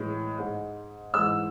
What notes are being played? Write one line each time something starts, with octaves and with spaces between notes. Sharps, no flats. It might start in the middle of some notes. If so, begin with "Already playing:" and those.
Already playing: A2 E3 G#3
G#2 G#3
G#2 E3 G#3 E6